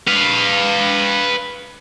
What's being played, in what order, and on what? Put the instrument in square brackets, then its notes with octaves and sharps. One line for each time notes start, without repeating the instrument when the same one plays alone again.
[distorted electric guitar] B4 F5